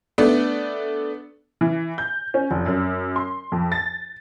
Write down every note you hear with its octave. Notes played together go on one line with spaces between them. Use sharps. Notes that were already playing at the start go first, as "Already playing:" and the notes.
A3 B3 D4
E3
G6
C#4
F1
F#2
C6
F2
A6